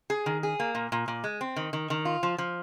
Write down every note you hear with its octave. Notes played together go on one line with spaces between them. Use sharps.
G#4
D#3
G#4
A#3
A#2
A#2
A#2
G#3
C4
D#3
D#3
D#3
F4
F3
F3